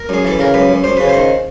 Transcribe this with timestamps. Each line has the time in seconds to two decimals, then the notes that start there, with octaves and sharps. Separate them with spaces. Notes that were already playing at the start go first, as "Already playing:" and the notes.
Already playing: A#4
0.09 F#2 G#4
0.25 E3 A4
0.39 C#3 A#4
0.54 F#2 B4
0.69 F#2
0.84 F#2 C5
0.97 C#3 B4
1.09 D#3 C5